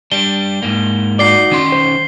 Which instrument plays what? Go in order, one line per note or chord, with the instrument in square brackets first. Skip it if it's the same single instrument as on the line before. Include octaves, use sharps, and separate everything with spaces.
[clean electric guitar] G3 D4 [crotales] G7
[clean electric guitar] G#2 A#3
[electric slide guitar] D#4 F#4 D5 [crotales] C7 G7
[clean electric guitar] D#3 C#4 C6
[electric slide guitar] C5